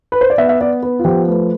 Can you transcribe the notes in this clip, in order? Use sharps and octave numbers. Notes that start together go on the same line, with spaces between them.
B4
C5
D5
B3 E5
E5
B3 D5
B3 B4
F4
F3 G4
A3 B4